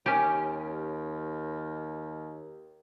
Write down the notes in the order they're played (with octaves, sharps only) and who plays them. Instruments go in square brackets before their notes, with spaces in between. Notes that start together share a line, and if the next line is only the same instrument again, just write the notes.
[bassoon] D#2 [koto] C#4 G4